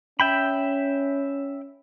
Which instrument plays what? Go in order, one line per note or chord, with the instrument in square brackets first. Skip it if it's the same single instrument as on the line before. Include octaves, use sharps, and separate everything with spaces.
[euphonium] C#4 [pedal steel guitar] E5 G5 B5